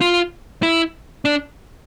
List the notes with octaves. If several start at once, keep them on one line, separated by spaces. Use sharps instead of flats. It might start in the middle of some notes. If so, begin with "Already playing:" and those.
F4
E4
D4